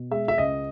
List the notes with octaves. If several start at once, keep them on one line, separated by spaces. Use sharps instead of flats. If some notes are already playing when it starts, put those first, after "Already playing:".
Already playing: B2
G#3 E5
E5
C#2 D#5